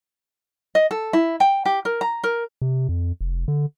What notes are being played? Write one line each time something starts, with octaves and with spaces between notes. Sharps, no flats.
D#5
A4
E4
G5
G4
A#4
A#5
A#4
C3
F2
F1
D3